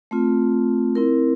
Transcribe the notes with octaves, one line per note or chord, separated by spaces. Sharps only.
A3 C4 F4
C4 E4 A#4